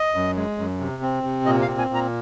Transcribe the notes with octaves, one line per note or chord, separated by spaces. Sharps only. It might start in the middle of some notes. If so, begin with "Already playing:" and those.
Already playing: D#5
F#2
G#3
F#2
C3
C4
C3
A#2 D#5
F5
C4
G#5
A#2
A#5